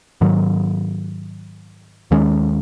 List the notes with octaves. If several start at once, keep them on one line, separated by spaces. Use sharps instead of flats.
G#2 D#3 F#3
D#2 D#3 G#3 C#4